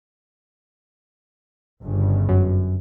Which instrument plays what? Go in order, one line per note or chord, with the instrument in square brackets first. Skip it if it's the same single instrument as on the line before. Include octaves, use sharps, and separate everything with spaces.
[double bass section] G1 G2 C#3
[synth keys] F#2